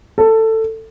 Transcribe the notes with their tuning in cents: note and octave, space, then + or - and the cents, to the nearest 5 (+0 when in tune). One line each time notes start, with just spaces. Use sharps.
A4 +15